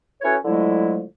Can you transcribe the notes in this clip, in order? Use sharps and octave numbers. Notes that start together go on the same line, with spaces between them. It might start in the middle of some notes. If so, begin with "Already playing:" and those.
C#4 E4 F#4 A4 B4 C#5
D3 F3 F#3 G#3 A3 E4